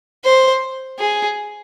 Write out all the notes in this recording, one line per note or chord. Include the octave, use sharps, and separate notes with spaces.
C5
G#4